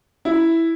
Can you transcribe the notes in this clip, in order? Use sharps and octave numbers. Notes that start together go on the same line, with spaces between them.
E4